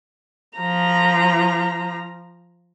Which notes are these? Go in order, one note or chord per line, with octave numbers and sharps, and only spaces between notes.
F3 A#5